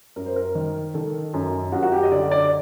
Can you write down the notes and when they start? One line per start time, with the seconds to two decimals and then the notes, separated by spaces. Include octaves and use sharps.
0.16 F#2 A#4
0.26 C5
0.36 A#4
0.55 D#3
0.94 D#3 A4
1.34 F#2
1.72 F#2 F#4
1.83 F#4
1.92 G4
2.03 D#5
2.12 D3 D5
2.31 D5